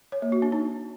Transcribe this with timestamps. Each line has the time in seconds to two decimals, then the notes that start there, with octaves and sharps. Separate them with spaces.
0.12 C#5
0.22 A#3
0.32 F#4
0.42 D4
0.52 D#4